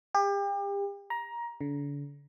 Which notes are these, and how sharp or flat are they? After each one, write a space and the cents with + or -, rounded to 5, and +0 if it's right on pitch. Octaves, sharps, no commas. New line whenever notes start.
G4 +35
A#5 +20
D3 -40